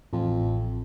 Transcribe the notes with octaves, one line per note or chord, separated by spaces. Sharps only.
A1 F2